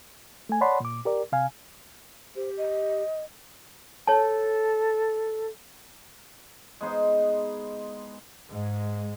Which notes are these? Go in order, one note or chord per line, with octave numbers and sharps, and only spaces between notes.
A3 G#5
C#5 D5 F#5 A5 B5 C6
A#2 D6
G4 A#4 D5
C3 F5 G#5
G4 C5
D#5
A4 C#5 A5
G#3 B3 D#4 C5
G#2 G#3